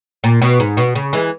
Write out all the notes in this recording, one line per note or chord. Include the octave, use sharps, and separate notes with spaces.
A#2
B2
G#2
B2
C#3
E3 G#3